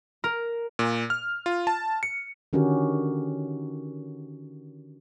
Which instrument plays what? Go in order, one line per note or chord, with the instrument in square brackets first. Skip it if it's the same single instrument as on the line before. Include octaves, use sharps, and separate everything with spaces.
[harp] A#4
[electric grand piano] A#2
F6
F4
A5
C#7
[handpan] D3 D#3 C#4 F#4 G4 A#4